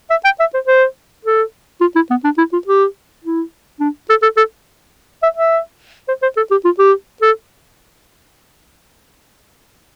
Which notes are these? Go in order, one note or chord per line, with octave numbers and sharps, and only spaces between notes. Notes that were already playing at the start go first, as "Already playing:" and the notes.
E5
G5
E5
C5
C5
A4
F4
E4
B3
D4
E4
F4
G4
E4
D4
A4
A4
A4
E5
E5
C5
C5
A4
G4
F4
G4
A4